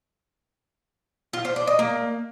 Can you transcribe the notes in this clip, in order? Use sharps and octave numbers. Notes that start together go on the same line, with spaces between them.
F4
C5
D4
D#5
A#3